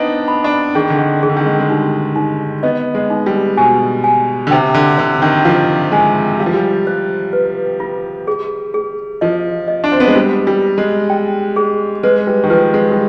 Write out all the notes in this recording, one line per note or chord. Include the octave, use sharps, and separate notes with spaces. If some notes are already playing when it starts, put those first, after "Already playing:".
Already playing: B3 C4 D4 D#4
B5
D4
D#3 G#4
D3
D#3
D#3 G#4
D3
D#3
G#3
G#3
G3 D#4
D#4
B3 D#5
G#3
D#4
G3
B2 G#5
G#5
D3
C3 G5
D3
D3 C5
D#3
F3 F5
G#3 G#5
G3 F5
F3
G3
C5
B4
F4
G#4
G#4
F3 D#5
D#5
D4
C4
B3
G#3
G3 F4
G3
F4
G#3
G5
G#4
G#3 B4
G3
D#3
F3 B4
G#3
G3